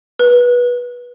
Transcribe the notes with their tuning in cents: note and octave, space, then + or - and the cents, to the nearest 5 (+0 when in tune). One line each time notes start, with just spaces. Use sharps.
B4 -20